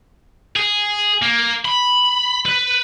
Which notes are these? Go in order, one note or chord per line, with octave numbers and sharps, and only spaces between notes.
G#4
A#3
B5
B4